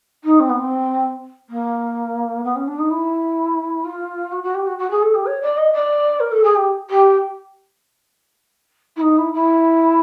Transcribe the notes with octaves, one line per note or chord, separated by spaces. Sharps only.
D#4
C4
B3
C4
A#3
B3
C#4
D4
D#4
E4
F4
F#4
F#4
G4
F#4
F#4
G#4
A4
G4
C#5
D5
D#5
D5
A#4
A4
G#4
G4
G4
E4
D#4
E4
E4